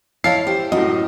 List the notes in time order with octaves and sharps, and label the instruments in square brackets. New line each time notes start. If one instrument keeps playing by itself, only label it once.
[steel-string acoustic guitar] E4 C#5 D#5 [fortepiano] F5 A5 [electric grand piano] C7
[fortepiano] G4 [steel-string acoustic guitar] C5
[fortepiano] F#2 A2 [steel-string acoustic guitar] F#4 [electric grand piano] D#5